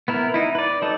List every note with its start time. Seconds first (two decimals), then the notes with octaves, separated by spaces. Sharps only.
0.08 B3 E4 A#4
0.34 D#4 E4
0.55 B4 D5
0.82 F#3 D#4 A4